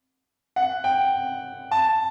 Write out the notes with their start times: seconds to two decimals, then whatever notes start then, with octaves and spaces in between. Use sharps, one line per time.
0.56 F#5
0.84 G5
1.71 A5